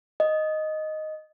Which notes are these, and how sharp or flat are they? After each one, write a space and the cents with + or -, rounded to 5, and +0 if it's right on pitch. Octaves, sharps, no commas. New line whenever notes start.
D#5 +0